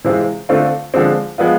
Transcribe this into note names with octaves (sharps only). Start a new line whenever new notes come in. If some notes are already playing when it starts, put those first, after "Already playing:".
C3 E3 G#3 C4 F4
D3 A3 C4 F4
D3 F3 G#3 C4
F3 G#3 B3 F4